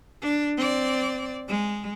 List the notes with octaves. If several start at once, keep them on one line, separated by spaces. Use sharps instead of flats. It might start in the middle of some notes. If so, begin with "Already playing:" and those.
D4
C4 D5
G#3